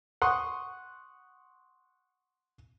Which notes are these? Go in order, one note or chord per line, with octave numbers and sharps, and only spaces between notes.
F#5 C6 C#6 D#6